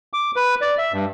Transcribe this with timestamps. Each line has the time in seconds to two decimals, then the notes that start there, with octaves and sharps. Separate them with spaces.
0.13 D6
0.36 B4
0.61 D5
0.78 E5
0.92 G2